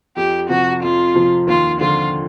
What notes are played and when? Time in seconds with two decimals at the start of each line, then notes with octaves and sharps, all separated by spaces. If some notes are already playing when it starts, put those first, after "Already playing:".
0.16 F2 G4
0.49 C3 F3 F#4
0.83 F2 F4
1.15 C3 F3
1.47 D#2 F4
1.81 D3 F3 F4